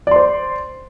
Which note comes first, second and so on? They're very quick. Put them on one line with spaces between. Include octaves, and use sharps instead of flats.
D5 C6 C5